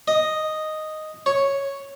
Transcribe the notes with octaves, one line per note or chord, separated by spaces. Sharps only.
D#5
C#5